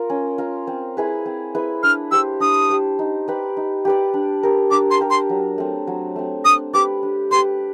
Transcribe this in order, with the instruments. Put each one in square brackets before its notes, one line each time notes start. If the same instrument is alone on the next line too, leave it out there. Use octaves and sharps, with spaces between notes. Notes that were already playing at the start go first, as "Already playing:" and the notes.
Already playing: [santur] F4 A#4
C#4
F4 A#4
C4
E4 G#4 B4
C4
E4 G#4 B4
[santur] D4 [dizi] F6
[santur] G4 C5 [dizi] E6
[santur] D4 [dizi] D#6
[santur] G4 C5
D#4
G4 B4 D5
D#4
G4 B4 D5
D4
G4 A#4
[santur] D4 [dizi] D6
[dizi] C6
[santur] G4 A#4
[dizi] C6
[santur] F#3
A3 C4
F#3
A3 C4
[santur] D4 [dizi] D#6
[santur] G4 B4 D5 [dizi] D6
[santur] D4
[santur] G4 B4 D5 [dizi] C6